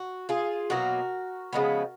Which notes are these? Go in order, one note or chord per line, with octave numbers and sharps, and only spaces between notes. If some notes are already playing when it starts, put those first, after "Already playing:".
Already playing: F#4
F4 G#4
B2 F#3 A#3 F#4 A#4
C#3 F3 G#3 B3